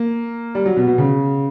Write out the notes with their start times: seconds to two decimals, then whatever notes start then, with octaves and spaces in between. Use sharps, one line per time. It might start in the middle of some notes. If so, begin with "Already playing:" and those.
Already playing: A#3
0.55 G3
0.66 F#3
0.77 B2
0.87 B2
0.98 C#3